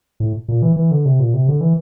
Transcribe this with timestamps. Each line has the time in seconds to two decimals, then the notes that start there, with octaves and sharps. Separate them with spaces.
0.20 A2
0.48 A#2
0.62 E3
0.76 E3
0.91 D3
1.05 C3
1.20 A#2
1.34 C3
1.49 D3
1.61 E3